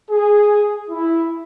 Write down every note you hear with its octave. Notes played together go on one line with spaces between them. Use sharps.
G#4
E4